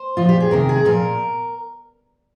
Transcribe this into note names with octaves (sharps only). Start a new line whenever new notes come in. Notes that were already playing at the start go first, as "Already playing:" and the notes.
Already playing: C5
A#2 F3 F4
G4
G#4
C3 D#3 A#4
G#4
A#2 F3 A#4